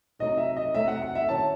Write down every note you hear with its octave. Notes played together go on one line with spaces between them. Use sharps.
C3 F#3 A3 D#4 D#5
E5
D#5
C3 F#3 A3 D#4 E5
F#5
F#5
E5
D#3 F#3 C#4 E4 A5